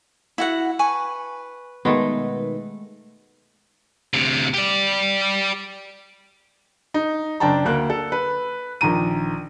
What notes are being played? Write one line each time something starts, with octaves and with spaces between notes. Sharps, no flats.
E4 F#4 F#5
B4 G#5 C#6
B2 D#3 G#3 A3 B3
D2 C3
G4 D5
D#4
F#1 D4 G5 A5 A#5
D2 A#3 F#6
A4
B4
A#1 D#3 A#5 D#7